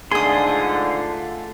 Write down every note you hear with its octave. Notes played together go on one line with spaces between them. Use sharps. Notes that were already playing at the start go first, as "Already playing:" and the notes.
G#2 D3 A3 F4 G#4 C6 D#6